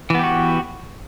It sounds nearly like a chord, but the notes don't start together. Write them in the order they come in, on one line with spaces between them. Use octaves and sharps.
E3 B3 G4 F#4